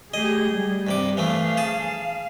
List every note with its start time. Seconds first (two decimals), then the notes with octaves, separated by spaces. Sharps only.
0.14 A3 G4 G#4 D#5
0.50 G3
0.87 G2 C3 D6
1.17 E3 F3 A3 F5
1.57 G#4 A5